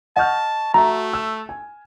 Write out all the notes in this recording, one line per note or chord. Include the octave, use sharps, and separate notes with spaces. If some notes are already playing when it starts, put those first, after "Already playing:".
D#5 F#5 A5 C#6 F6 G6
A3 F#4 E5 A#5
E6
G#5